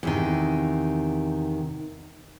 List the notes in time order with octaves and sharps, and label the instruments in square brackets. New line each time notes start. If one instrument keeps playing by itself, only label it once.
[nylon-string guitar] E2 C3 D#3